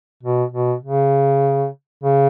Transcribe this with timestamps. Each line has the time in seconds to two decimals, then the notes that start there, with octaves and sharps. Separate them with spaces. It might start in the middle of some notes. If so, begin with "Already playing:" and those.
0.23 B2
0.52 B2
0.83 C#3
2.04 C#3